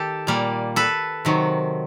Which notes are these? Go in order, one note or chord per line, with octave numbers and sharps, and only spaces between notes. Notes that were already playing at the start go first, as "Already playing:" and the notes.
Already playing: D#3 G4 A4
A#2 G3 A#3
A4 B4
C3 D#3 F#3